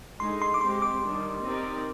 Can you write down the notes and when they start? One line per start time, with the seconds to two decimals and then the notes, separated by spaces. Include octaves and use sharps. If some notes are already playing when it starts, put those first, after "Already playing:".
0.20 D3 G#3 D#4 G#4 C6
0.42 C6
0.54 D6
0.61 G#3 C4 G4 C6
0.82 D6
1.03 D#3 G3 D4
1.44 C4 D#4 G4 A#4 D5